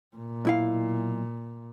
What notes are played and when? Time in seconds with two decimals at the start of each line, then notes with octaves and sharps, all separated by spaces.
0.16 A#2
0.45 B1 E4 F5